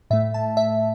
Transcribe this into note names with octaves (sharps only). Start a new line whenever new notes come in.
A2 A3 E5
A5
E5